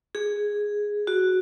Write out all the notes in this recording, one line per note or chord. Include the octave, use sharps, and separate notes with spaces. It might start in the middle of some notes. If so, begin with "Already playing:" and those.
G#4
F#4